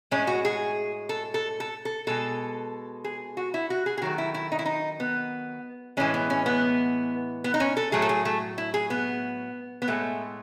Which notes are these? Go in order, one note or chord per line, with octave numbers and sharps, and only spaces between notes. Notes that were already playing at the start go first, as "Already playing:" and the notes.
A2 G#3 C#4
F#4
G#4
A4
A4
A4
A4
B2 G#3 A4
G#4
F#4
E4
F#4
G#4
G#4
D#3 F#3 A3 F#4
E4
E4
D#4
E4
D#4
B3
A2 E3 G#3 C#4
B3
C#4
B3
B3
D#4
C#4
A4
A2 F#3 A3 G#4
A4
G#4
A3
E4
G#4
B3
B3
A2 G#3 A3